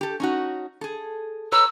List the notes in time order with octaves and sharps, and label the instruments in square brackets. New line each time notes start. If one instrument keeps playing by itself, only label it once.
[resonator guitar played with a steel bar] G4 A4
C#4 D#4 F#4
G#4 A4
[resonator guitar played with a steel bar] B4 C#5 A#5 [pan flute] E6